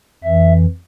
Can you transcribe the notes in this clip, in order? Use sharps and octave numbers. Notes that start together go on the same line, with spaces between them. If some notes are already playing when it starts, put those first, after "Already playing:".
F2 E3 E5